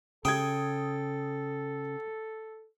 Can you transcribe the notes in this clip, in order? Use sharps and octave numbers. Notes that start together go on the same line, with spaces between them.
C#3 A4 G5 D#6 G#6